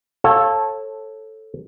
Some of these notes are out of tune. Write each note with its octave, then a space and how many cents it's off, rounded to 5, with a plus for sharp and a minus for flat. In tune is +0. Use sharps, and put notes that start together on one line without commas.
A4 +0 C#5 -30 F5 +0